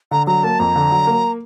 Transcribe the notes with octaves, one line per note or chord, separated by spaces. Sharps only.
D3 A#5
F#3 A#5
A#3 A5
F2 A#5
D3
F#3
A#3